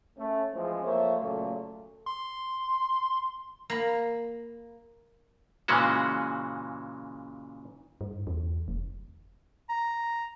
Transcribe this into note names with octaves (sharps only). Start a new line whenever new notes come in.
A3 C#4
E3 F3 G#3 C4
F3 A3 A#3 C5 C#5 E5
A#2 C#3 F#3 A3
C6
A#3 B5
A#2 C#3 E3 G#3 C#4 F#4
G2
E2
F1
A#5